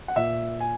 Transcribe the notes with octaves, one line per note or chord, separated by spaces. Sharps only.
F#5
A#2 E5
G#5